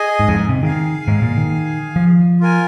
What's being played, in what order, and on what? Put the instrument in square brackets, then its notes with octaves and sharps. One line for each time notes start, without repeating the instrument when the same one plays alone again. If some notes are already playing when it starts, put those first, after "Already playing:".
Already playing: [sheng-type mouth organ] G#4 D#5 G#5
[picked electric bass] G#2
F2
G#2
C3
[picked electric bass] D#3 [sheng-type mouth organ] G#4 F5 G#5
[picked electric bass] G#2
A#2
D#3
F3
[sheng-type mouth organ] F4 A#4 G#5